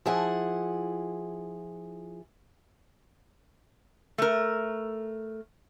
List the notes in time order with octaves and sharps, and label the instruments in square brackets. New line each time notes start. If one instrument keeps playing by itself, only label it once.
[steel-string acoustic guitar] F3 E4 G#4 F#5
[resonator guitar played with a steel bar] A3 A#4